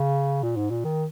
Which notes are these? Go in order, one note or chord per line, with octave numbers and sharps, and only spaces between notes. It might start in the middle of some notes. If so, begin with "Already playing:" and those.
Already playing: C#3
A#2
G#2
A#2
D#3